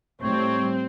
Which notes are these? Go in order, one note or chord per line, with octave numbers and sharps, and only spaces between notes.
A2 G3 C4 C#5